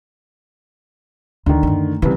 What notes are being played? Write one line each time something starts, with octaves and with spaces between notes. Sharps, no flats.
D2 D3 D#3
F#2 A3
C2 C#3 E3